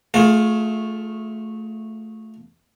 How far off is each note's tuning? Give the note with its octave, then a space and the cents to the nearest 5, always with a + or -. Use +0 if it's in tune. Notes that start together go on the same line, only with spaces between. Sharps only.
A3 +0 F4 +15 G#4 +25